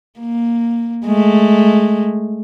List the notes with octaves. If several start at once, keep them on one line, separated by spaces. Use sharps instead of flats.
A#3
G#3 A3